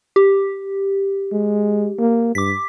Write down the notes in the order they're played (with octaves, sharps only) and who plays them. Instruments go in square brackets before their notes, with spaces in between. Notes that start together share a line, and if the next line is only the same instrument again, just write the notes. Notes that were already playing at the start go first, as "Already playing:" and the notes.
[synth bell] G4
[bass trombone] G#3
A#3
[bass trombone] G2 [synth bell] D6 B6